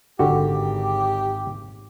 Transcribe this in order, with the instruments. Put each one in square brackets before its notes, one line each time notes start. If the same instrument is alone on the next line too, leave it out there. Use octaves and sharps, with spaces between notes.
[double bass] G#1 [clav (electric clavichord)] D3 F#4 [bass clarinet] G4